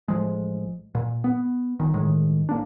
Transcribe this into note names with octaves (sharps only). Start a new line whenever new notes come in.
A1 F3 G#3
A#2
B3
G1 D#3
G1 A2 D#3 G#3
A1 A#3 D4